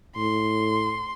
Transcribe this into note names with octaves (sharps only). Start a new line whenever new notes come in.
A2 C6